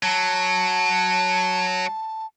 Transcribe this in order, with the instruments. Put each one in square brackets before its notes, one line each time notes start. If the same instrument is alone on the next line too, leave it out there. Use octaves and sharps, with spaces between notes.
[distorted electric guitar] F#3 [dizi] A5